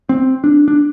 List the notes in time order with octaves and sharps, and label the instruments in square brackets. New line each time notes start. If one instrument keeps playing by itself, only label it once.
[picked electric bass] C4
D4
D4